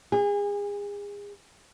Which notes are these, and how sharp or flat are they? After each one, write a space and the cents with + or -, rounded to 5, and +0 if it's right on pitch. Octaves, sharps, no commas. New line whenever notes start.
G#4 -35